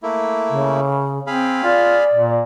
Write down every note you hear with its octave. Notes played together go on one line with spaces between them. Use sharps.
A3 A#3 E4
C#3
C4 G#4 F5 B5
F4 D5
A#2